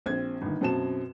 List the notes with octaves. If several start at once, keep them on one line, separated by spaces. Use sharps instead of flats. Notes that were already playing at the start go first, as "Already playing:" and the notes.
A#1 C4 G#6
G1 D#3
F#2 B2 C4 A5 E7